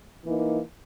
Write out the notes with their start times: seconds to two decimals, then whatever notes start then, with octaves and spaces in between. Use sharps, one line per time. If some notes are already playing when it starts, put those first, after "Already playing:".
0.24 E3 A#3 D#4